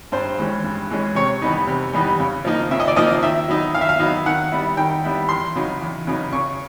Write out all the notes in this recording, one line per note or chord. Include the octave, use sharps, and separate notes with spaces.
G2 C5
E3 G#3 C#4
G2
E3 G#3 C#4
C3 C#5
E3 G3 B3 D#4
C3
E3 G3 B3 D#4
C#3
F3 A#3 D#4
C#3 E5
D#5
D5
F3 A#3 D#4 D#5
D#3 E5
F#3 B3 D#4
D#3 F5
E5
F5
F#3 B3 D#4
D#3 F#5
G3 B3 E4
D#3 G5
G3 B3 E4
E2 C6
C#3 F#3 B3 D#4
E2
C#3 F#3 B3 D#4
C#3 C#6